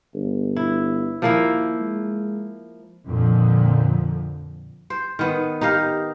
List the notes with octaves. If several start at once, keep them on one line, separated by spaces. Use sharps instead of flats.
G1
E4
D#2 F3 A#3 E4
G#3
F2 A#2 D3 F3
C5
D#3 B3
D#4 G4 D#5 F5